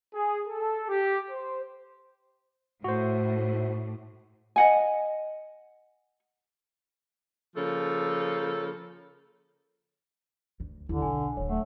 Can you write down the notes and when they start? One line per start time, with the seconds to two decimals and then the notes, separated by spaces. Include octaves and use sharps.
0.14 G#4
0.47 A4
0.88 G4
1.30 C5
2.84 A2 F#4 C5
4.56 D#5 F#5 G#5
7.56 C#3 F3 A#3 A4
10.60 D2
10.89 D#2 D3 E4
11.02 B1 D4 G#5
11.37 D#1 F#3 C#5
11.49 A3 F#5